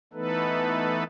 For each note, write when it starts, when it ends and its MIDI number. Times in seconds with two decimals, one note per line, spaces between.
0.13 1.04 52
0.13 1.04 57
0.13 1.04 59
0.13 1.04 63
0.13 1.04 69
0.13 1.04 71